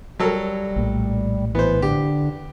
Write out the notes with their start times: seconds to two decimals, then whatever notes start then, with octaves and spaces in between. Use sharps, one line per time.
0.20 F#3 G3 A4 A#4
0.76 A#1 A2
1.55 E3 B3 C5
1.82 D3 G4